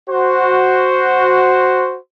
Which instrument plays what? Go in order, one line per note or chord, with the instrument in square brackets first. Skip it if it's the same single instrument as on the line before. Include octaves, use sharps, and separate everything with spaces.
[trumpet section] F#4 C5